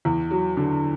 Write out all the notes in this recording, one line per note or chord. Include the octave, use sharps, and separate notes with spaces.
E2
F#3
D3